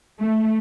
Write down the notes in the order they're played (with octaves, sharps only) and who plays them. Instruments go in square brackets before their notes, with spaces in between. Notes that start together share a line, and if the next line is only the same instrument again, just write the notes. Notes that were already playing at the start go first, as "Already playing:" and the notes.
[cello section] A3